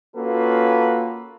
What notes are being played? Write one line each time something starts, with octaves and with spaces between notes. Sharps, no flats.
A#3 C#4 F4 F#4 A4 B4